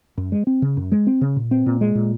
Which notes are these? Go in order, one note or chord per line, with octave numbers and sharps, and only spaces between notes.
F#2
G#3
C4
C#3
F#2
G#3
C4
C#3
A#2
C4
A#2
G#3
A#2